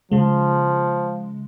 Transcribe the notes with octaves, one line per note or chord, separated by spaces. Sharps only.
C#3 F3 G#3